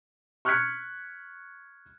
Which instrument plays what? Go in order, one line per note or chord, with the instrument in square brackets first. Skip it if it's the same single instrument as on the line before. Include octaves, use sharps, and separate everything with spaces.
[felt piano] C#6 F6 F#6 G#6 B6 C#7